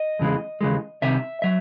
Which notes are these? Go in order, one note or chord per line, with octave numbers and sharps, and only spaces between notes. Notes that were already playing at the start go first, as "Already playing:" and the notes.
Already playing: D#5
E2 C#3 E3 G#3
D#2 C#3 E3 G#3
C2 C3 D#3 E5
F#3 E5